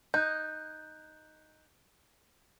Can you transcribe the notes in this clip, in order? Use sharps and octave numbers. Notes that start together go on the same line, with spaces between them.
D#4 F#6 G6